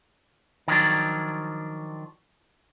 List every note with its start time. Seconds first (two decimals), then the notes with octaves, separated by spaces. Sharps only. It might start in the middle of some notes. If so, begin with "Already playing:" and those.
0.68 D#3 F3 F#3 D4